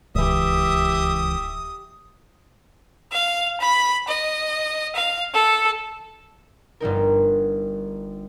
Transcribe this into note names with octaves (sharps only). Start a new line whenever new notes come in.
D1 C#2 E3 G4 E5 D#6
F5
B5
D#5
F5
A4
G1 G3 D#4 A#4